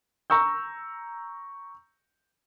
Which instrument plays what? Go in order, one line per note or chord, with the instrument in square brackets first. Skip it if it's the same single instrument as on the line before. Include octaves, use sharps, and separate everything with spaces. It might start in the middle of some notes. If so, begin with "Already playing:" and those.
[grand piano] A#5 C#6 E6 G6